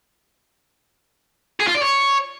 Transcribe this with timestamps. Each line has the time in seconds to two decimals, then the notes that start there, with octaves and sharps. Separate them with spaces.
1.60 G#4
1.67 F4
1.75 D5
1.82 C#5